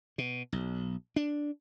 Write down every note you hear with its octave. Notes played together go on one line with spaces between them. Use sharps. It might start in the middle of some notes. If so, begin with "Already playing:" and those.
B2
B1
D4